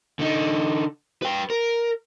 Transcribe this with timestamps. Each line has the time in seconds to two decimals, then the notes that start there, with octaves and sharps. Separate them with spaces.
0.19 D3 D#4
1.22 B4 G5
1.50 A#4